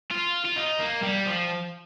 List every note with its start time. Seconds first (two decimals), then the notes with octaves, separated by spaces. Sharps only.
0.11 F4
0.45 F4
0.57 D#4
0.80 A#3
1.03 G3
1.27 F3